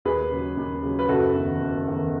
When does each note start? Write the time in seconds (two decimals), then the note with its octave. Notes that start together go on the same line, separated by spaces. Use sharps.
0.05 D#2 G#4 B4
0.31 C#3 F#3
0.57 D#2
0.83 C#3 F#3
0.99 B4
1.09 F#1 F#4 A4
1.35 E2 D#3
1.60 F#1
1.87 E2 D#3